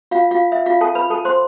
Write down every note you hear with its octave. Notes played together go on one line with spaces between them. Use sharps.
F4 F5
F4 F5
E5
F4 F5
A4 A5
B4 B5
A4 A5
C5 C6